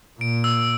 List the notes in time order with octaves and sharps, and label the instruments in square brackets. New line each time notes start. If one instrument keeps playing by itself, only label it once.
[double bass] A#2 [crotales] D7
[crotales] E6